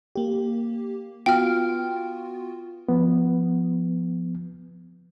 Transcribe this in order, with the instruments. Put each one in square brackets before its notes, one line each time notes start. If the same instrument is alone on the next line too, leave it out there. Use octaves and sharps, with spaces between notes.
[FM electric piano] A#3 G4
[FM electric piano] B3 F4 F#4 [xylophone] G5 F6
[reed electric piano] F3 B3